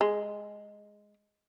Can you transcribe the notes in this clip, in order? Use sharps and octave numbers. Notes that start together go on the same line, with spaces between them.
G#3